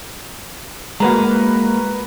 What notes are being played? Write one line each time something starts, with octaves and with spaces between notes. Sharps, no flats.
G#3 A#3 F#4 B4 A#5